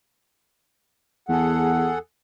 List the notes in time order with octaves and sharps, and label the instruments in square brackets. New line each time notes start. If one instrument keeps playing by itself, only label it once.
[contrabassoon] E2 [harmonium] G#4 A4 F#5